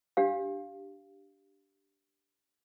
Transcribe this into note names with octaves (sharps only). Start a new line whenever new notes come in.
D4 G4 F5